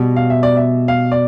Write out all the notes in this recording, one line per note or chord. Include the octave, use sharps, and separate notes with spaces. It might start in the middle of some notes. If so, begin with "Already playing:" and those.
Already playing: B2 G3 B3
F5
E5
D5
E5
F5
D5